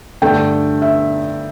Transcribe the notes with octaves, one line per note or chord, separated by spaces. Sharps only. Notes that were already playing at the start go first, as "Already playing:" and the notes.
G2 D3 A3 G5
E5